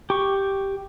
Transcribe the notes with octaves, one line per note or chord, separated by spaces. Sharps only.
G4 C#6